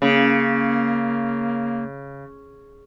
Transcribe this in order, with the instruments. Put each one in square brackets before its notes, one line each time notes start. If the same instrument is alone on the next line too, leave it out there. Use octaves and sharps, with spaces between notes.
[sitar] C#3 [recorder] A#3